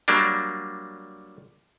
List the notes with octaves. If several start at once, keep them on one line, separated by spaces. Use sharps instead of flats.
F#3 G3 A#3 D4